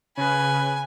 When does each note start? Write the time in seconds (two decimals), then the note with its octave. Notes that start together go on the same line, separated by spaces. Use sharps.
0.17 C#3 B4 G#5